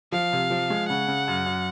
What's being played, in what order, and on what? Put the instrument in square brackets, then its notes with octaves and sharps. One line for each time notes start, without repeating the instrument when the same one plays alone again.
[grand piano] F3 [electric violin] F5
[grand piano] C3
F3
G#3
[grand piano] C#3 [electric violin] F#5
[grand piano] C#3
F#2
F#2